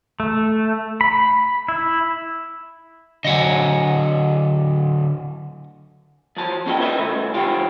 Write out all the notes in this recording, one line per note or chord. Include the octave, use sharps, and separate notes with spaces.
A3
B5
E4
D3 F#3 D#5 F#5 G#5
F3 F#3 A5
B3 C#4 F4 G#4 D#5 G5
A#4 B4 D#5 E5
C#3 G#3 A3
E2 G#3 F4 G4 F5